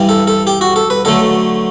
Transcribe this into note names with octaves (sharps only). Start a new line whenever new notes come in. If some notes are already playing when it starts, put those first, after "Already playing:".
Already playing: G2 E3 G3
A4
A4
G4
F#4
A4
B4
D3 F#3 A3 A4